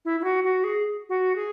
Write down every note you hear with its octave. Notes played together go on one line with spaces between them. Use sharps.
E4
E4
F#4
F#4
G#4
F#4
G#4